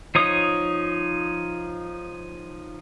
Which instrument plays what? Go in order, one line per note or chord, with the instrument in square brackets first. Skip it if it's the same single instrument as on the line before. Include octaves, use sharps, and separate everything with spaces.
[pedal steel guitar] F3 D#4 C#5 D#6